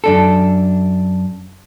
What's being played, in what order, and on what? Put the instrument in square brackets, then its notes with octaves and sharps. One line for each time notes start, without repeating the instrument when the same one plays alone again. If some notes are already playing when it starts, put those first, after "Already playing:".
[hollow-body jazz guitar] F#2 D4 A4